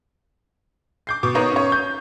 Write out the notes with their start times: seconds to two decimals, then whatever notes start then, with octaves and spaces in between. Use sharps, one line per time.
1.07 D6 G6 C7
1.23 B2 D6
1.35 B3 D#4 F#4 A#4 B4 C#5
1.52 C#4 C#5
1.72 G6